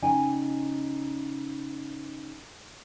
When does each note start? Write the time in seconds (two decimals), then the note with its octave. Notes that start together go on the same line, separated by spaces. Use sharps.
0.02 C#3 D#4 G5 G#5